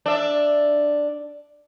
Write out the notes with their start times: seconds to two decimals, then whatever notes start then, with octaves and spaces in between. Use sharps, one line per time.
0.06 D4 E5